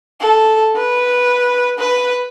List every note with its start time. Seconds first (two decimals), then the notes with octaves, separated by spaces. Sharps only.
0.20 A4
0.75 B4
1.78 B4